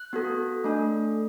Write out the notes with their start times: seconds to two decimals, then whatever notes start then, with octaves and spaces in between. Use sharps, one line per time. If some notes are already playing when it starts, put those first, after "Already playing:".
Already playing: F#6
0.13 B3 F#4 A4
0.64 A3 D4 A4